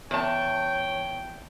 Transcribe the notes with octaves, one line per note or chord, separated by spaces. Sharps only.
E2 C#5 G5 A5